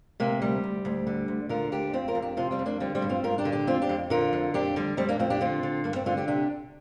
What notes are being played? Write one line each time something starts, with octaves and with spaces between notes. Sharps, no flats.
C3 A#3
D2 G3
D2
D2
D3
D2
D3 F4 A#4
D2 D4 G4
F2 C4 F4
F4 A#4
F2
D4 G4
C3 C4 F4
G3 C4
F2
A#3 D4
D3 G3 C4
G3 C4
G2
C4 F4
G2 F4 A#4
D4 G4
D3
D4 G4
F2 C4 F4
D4 G4
F2
D3 F4 A#4
F2
F2 D4 G4
D3 G3
F2 G3 C4
A#3 D4
F2 C4 F4
D4 G4
D3 C4 F4
D3
G2 A#3
G3 C4
D3 C4 F4
D4 G4
C3 D4 G4